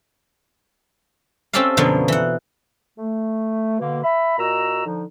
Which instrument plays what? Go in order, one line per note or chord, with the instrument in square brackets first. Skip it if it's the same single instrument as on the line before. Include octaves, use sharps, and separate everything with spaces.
[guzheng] C4 C#4 G4 A4 D5 F5
F#2 B2 D3 F3 B3 A#4
E3 F#5
[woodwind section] A3
B2 D3 A#3
E5 B5
A#2 F#4 D#5 A#5 E6
D3 F3 D#4